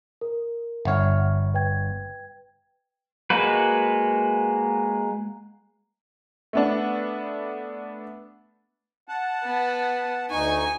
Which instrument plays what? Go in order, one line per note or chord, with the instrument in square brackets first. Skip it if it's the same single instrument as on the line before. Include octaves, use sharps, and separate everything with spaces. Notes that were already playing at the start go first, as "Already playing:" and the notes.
[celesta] A#4
[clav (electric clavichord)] G1 C#5 [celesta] E5 F#5 F6
[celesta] B4 G5 G#6
[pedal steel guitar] G#3 A#3 F#4 B4
[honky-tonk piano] A3 B3 D4
[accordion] F#5 A5
[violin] B3
[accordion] D2 D#4 C#6 [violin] G#5